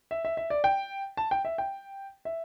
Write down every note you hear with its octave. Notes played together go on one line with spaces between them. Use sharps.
E5
E5
E5
D5
G5
A5
G5
E5
G5
E5